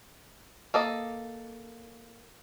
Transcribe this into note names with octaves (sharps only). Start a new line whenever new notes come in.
A#3 A4 D#5